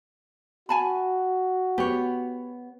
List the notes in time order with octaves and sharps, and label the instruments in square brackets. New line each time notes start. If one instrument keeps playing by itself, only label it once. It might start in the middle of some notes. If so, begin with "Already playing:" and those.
[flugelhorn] F#4 [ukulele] G#5 A5 B5
[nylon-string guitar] B3 C#5 [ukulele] G4